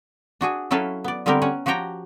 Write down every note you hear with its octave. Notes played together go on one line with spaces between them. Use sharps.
D4 F#4 G#4 G#5
F#3 C#4 E4 A4 B4 F5
B3 D5
D3 G3 B3 C4 G4 A#4
C#4 F#5 G#5
F3 F#4 G4 C#5 G5 A#5